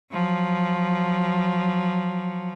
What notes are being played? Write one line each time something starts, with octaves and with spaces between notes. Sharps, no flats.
F3 F#3